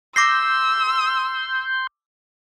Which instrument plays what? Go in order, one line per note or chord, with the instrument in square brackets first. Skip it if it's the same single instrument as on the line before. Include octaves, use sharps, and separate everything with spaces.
[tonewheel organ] C6 G6 [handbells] D6 A#6 C7 [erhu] E6